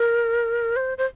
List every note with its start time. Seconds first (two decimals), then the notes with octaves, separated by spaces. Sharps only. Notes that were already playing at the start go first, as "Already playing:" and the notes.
Already playing: A#4
0.76 C5
0.98 C5